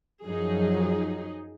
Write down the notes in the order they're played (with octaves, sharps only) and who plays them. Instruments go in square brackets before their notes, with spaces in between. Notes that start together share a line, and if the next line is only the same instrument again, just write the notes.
[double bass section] F#2 F3 F#3 [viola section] D#4 G#4